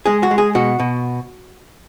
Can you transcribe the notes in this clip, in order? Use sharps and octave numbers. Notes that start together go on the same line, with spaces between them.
G#3 G#4
F#4
G#3
G#4
B2 F#4
B2